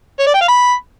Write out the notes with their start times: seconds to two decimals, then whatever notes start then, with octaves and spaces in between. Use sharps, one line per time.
0.19 C#5
0.27 D5
0.34 G5
0.41 F5
0.48 B5